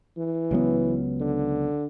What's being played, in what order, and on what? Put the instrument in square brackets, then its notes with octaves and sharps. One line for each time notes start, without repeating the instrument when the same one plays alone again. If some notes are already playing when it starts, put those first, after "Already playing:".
[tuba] E3
[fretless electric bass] C#2 F#3 B3
[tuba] D3